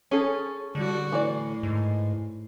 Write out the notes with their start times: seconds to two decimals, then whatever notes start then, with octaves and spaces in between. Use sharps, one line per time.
0.11 C#4 G#4 A4
0.75 D3 G3 F#4
1.12 A2 E3 D5
1.63 G#2